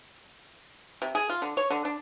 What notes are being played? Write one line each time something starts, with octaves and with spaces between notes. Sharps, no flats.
C3
G#4
F4
D3
C#5
D3
D4